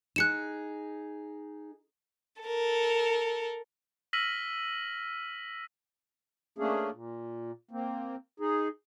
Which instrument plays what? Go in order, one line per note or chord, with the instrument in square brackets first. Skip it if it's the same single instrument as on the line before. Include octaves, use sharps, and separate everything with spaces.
[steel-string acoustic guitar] D#4 G#4 [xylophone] F#6 C#7 E7
[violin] A4 A#4
[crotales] E6 F6 A#6 B6 D#7 F#7
[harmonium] A3 A#3 C#4 D4 G#4
A#2
A#3 C4
D#4 G#4